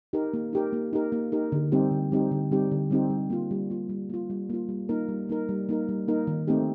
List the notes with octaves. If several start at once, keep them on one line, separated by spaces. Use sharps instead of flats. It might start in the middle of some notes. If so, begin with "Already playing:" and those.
D#4 G4 A#4
A#3
D#4 G4 A#4
A#3
D#4 G4 A#4
A#3
D#4 G4 A#4
D3
G3 C4 D#4 G4
D3
G3 C4 D#4 G4
D3
G3 C4 D#4 G4
D3
G3 C4 D#4 G4
G3
A#3 F4
G3
A#3 F4
G3
A#3 F4
G3
A#3 F4
G3
A#3 D#4 A#4
G3
A#3 D#4 A#4
G3
A#3 D#4 A#4
G3
A#3 D#4 A#4
D#3
A3 C4 D#4 G4